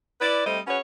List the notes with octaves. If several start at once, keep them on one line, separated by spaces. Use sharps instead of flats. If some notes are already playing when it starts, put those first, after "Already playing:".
E4 B4 D5
G3 A3 C4 C5 D#5
C#4 F#4 G#4 B4 C#5